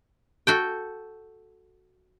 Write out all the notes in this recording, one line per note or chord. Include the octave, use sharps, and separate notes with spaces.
F#4 A4 G5